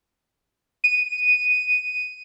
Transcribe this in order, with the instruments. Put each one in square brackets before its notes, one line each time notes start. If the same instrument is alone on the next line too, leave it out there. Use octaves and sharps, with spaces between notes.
[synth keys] D#7